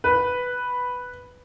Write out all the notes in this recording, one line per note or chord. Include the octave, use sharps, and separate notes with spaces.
B4